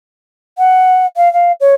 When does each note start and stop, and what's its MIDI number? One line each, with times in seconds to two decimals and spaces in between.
0.58 1.06 78
1.16 1.31 77
1.33 1.52 77
1.60 1.74 73